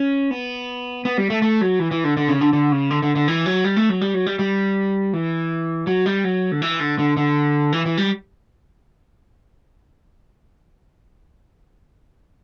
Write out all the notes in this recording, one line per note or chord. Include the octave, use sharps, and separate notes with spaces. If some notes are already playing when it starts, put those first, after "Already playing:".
Already playing: C#4
B3
B3
G3
A3
A3
F#3
E3
E3
D3
D3
C#3
D3
D3
C#3
D3
D3
D3
E3
F#3
G3
A3
F#3
G3
F#3
G3
G3
E3
F#3
G3
F#3
D3
E3
D3
D3
D3
E3
E3
G3